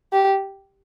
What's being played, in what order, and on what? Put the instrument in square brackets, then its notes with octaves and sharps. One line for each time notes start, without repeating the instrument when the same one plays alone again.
[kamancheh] G4